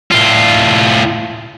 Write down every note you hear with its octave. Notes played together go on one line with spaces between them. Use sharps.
A2 F4